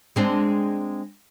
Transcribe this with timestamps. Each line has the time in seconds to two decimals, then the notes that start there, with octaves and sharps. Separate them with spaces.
0.16 G#3 C4 D4